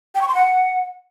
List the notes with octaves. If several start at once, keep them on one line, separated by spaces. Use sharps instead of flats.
G5
C#6
C6
F#5